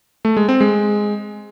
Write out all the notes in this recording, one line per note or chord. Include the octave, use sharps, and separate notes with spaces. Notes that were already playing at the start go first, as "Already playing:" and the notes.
A3
G#3
C4
G#3